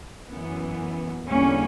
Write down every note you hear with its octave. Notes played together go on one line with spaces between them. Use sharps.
F#2 E3 B3
E2 D3 G3 A#3 C#4